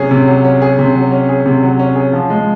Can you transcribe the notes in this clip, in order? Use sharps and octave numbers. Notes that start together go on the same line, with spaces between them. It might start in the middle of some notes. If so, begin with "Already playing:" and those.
Already playing: C3 F#3 C#4 G#4
C3
F#3
C#4
G#4
C3
F#3
C#4
G#4
C3
F#3
C#4
G#4
F3
G#3